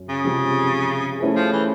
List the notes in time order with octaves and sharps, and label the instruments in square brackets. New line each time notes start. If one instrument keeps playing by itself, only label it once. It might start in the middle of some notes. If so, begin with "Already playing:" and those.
Already playing: [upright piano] F#2 C#4
[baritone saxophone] C#3
[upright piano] C3 F3 G#3
A3 C#4 E4 G#4 C5
[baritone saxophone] F3
E3